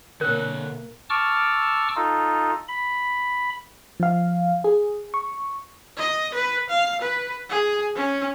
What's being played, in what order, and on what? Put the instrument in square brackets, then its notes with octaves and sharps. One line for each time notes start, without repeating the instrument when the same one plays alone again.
[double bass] B2 A#3 [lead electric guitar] D3 C#5 [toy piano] A#4 [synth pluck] F#6
[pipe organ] A5 C#6 D6 E6 F6
D#4 F4 A4
B5
[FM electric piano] F3 F5
G#4
C#6
[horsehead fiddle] D#5
B4
F5
B4
G#4
C#4